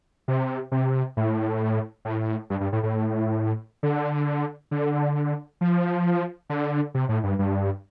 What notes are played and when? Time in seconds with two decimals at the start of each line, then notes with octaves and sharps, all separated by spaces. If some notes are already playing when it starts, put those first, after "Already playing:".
0.28 C3
0.72 C3
1.17 A2
2.05 A2
2.50 G2
2.60 G2
2.73 A2
2.83 A2
3.83 D3
4.71 D3
5.61 F3
6.50 D3
6.94 C3
7.09 A2
7.24 G2
7.39 G2